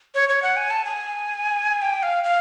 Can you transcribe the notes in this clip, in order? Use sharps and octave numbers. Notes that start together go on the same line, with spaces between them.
C#5
C#5
F#5
G#5
A5
G#5
G5
F5
F5